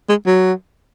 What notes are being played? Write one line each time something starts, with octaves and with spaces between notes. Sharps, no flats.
G#3
F#3